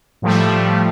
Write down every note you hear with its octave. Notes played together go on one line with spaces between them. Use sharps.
A2 F3 G3 A3